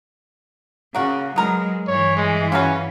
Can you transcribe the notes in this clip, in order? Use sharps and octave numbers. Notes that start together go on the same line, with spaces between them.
C#3 A#3 F#4
F#3 G#3 B3 A#4
G2 E3 C#5
G#3
C#3 C#4 F#4 B4